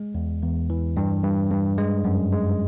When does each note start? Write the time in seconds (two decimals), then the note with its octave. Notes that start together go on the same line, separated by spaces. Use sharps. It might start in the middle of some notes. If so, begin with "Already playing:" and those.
Already playing: G#3
0.15 E2
0.42 E2
0.70 E3
0.97 G2
1.24 G2
1.50 G2
1.78 G#3
2.05 F#2
2.32 G#3